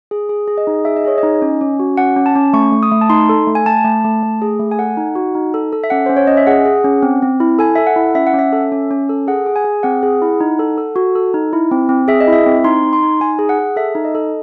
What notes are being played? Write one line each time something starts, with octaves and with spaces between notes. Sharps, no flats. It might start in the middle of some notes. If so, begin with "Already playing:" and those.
G#4
G#4
G#4
D#5
D#4
G#4 E5
D#5
G#4 C#5
D#4 D#5
C#4
C#4
F#4
C#4 F#5
C#4
A5
C#4
A3 C#6
A3
D#6
A3
A5
D#4 C6
A4
A3
G#5
A3 A5
A3
A3
A3
G#4
A3
G#5
A4 F#5
D#4
F#4
D#4
A4
A4
E5
C#4 F#5
C#4 C5
C#5
C#4 D#5
E5
G#4 F#5
G#4
C#4
C4
C4
E4
A4 G#5
A4 E5
F#5
E4
C#4 E5
F#5
C#4
E5
A4
C#4
C#4
A4
G#4 F#5
G#4
G#5
G#4
C4 F#5
G#4
E4
D#4
A4
A4
F#4
A4
D#4
E4
C4
C4
G#4 E5
D#5
E4 E5
C4
D#4 C6
D#4
C6
D#4
D#4 G#5
G#4
F#5
G#4
A4 E5
D#4
D#5
A4